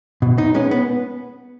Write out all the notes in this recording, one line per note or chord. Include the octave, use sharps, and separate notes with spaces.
B2
D#4
G#3 B3 C#4
B3